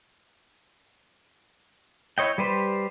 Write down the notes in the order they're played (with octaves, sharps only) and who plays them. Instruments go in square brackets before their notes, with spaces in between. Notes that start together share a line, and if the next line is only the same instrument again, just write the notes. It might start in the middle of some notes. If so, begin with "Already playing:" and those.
[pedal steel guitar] E4 C#5 D#5 G5
G3 G4 B4 C5